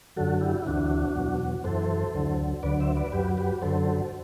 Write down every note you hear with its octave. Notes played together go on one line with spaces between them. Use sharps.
F#2 D3 F#3 F#4 A4
E4 G4
E4
D2 C3 E3 D4 F#4
E2 B2 F#3
F#2 E3 A4 C5
D2 D3 F#3
D2 D3 F#3 B4 D5
C5 E5
B4 D5
F#2 F#3 G4 B4
G4 B4
F#2 D3 F#3 A4 C5